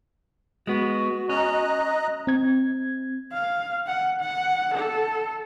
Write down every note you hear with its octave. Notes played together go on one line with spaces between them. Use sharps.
G#3 B3 F#4
C#4 D#5 A#5 F#6
C4 G#6
F5
F#5
F#5
A4